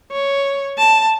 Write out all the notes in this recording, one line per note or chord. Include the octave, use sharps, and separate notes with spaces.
C#5
A5